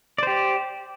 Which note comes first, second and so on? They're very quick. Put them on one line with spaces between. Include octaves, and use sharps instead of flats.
D5 C5 G4